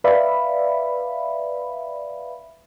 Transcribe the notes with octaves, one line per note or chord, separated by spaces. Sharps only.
B4 D5 E5 F5 B5